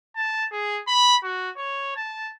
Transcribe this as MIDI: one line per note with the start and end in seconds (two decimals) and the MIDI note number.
0.16 0.45 81
0.52 0.81 68
0.87 1.16 83
1.23 1.50 66
1.57 1.96 73
1.96 2.32 81